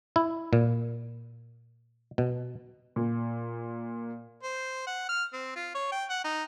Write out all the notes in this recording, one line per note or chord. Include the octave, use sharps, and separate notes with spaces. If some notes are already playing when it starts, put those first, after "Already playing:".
E4
A#2
B2
A#2
C5
F#5
F6
C4
F4
C#5
G5
F#5
D#4